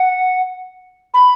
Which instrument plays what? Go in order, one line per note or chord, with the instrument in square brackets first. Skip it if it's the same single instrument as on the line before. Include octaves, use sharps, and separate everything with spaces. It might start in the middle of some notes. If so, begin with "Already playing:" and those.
Already playing: [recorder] F#5
B5